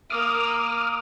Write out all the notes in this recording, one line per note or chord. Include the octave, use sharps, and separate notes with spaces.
A#3 D6 D#6 F6